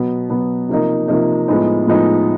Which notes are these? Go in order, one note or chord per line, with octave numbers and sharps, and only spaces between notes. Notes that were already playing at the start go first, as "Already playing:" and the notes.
Already playing: B2 F#3 B3
B2 F#3 B3
C3 F3 A#3 D#4
C3 F3 A#3 D#4
A2 F3 G#3 B3 D#4
A2 F3 G#3 B3 D#4